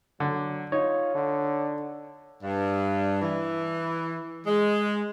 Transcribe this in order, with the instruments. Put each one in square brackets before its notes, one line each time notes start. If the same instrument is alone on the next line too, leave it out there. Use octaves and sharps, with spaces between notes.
[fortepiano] D3 [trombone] F#3
[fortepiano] D#4 [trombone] F4 [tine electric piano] C#5
[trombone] D3
[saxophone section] G2
E3
G#3